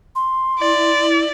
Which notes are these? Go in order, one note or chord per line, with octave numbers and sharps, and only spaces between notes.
C6
E4 D5